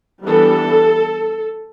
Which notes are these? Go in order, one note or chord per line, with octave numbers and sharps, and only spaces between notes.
E3 G3 B3 D4 A4